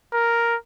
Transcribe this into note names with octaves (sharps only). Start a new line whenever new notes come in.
A#4